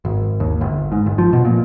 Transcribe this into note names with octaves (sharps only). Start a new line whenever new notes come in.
G#1
D#2
G1
G#2
G1
F3
B2
A#2